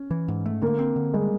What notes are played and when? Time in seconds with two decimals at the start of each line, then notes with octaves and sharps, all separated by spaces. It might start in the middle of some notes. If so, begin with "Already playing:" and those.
Already playing: C#4
0.11 E3
0.28 G#2
0.46 A3
0.62 D3 A#3
0.79 C4
0.96 D3
1.14 G3 G#3